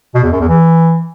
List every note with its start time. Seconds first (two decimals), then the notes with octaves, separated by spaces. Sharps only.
0.15 B2
0.23 E2
0.32 F#2
0.40 E2
0.49 E3